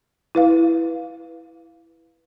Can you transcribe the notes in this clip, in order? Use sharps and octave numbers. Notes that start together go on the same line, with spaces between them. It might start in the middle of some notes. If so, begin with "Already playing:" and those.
E4 B4 F5